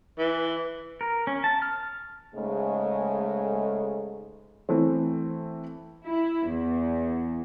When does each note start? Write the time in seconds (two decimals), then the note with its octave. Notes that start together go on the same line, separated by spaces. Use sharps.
0.18 E3
1.01 A#4
1.27 C#4
1.44 A5
1.62 F6
2.33 G#2 C#3 G#3 A3
4.69 E3 A3 C4
6.05 E4
6.49 E2